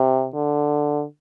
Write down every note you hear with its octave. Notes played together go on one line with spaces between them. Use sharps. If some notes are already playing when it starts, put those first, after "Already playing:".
Already playing: C3
D3